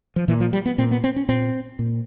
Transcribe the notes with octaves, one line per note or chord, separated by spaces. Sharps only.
F3
A#2 E3
F3
G3
B3
A#2 C4
B3
C4
C#4
A#2 C4
A#2